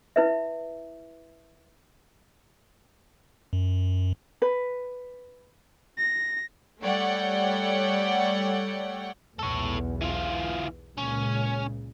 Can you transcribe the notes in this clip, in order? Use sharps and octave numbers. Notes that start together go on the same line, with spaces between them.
E4 B4 E5
F#2
B4
A#6
G3 A3 C#5 D5 F#5 G5
B1 E2 A4 C#5
E3 F4
C#2 A#2 C#3 C#4